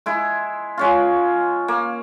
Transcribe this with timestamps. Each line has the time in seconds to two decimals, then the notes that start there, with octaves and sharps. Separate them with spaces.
0.06 G#3 E4
0.78 G#3 C#4 F4
1.68 A#3